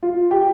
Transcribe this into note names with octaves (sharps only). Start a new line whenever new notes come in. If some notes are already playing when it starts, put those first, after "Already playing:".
F4
G4